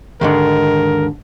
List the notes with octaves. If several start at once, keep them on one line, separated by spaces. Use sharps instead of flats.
D#2 G#2 D3 A#4